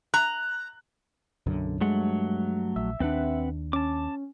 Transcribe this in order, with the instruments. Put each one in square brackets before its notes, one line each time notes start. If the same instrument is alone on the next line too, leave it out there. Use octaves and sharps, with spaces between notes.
[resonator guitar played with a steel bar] A#5 [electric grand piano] F#6
[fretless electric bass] B1 F#2 D3
[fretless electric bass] G2 [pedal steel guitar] F#3 A3 F#5 [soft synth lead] G#3
[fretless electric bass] A#1 [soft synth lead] E5
[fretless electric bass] D#2 G#3 D4 [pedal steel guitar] C4 B4 F#5
[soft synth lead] C#4 [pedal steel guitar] A5 D6